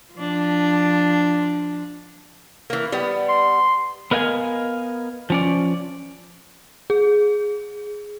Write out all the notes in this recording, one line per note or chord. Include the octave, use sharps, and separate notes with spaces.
F3 D4
E3 A#3
G3 B3
C6
B3 A#4 D#5 F5 G5 G#5
F3 C#4 D5
G#4